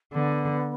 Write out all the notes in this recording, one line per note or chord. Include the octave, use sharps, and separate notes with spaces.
D3 B3